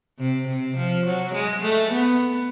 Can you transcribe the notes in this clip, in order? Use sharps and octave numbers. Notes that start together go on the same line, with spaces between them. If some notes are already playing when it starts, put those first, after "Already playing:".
C3
C3
F3
F#3
G#3
A3
B3